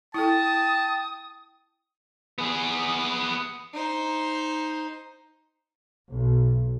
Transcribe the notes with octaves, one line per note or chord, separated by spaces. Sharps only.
E4 A4 G5 A5 D#6
B3 G#4
D#4 C5
B1